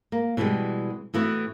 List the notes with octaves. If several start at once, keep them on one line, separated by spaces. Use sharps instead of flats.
A#3
B2 E3 F3 G3 G#3
A2 E3 B3 F#4